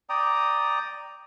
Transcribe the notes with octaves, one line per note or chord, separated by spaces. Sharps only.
D5 G5 A#5 D#6